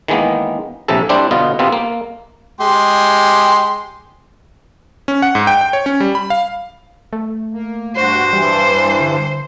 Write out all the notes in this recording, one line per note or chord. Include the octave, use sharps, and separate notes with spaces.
D#3 E3 G#3 A#3 B3
A#1 A2 C3 E3 A4
G3 C4 D4 E4 C5
B2 D3 B3 F4 D#5
C3 B3 C4 F4 A4
A#3
G#3 G4 C6
C#4
F#5
G#2
G5
G5
C#5
C#4
G3
B5
F5
A3
A#3
G2 F#4 C5
G2 E3 G3
D3